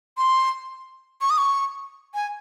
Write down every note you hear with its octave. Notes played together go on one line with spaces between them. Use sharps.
C6
C#6
D#6
C#6
G#5